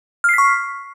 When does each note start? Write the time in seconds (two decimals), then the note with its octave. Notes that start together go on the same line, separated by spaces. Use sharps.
0.24 F6
0.29 C7
0.34 B6
0.38 C#6